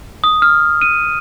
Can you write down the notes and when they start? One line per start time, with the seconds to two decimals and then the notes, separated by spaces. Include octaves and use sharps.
0.24 D#6
0.42 F6
0.81 D#7